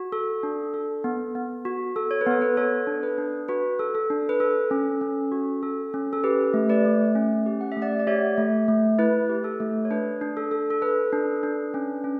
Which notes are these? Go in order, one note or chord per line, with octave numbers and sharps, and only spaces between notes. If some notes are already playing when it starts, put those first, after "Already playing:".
Already playing: F#4
A4
D4
A4
B3
B3
F#4
A4
C#5
B4
B3 A4
B4
A4 C#5
D4
B4
D4
F#4 B4
A4
A4
D4
B4
A4
C#4
C#4
F#4
A4
C#4
A4
G4 B4
A3
B4 D5
A3
C#4
G4
F#5
E5
A3
D5 F#5
D5
G4 C#5 E5
A3
A3
E4 B4
G4
A4
A3
C#5
D4 B4
D4
A4
A4
A4
A4 B4
D4
D4
C#4
C#4